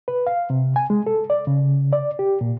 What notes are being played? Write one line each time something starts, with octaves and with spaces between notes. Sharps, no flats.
B4
F5
C3
G#5
G#3
A4
D5
C#3
D5
G4
A#2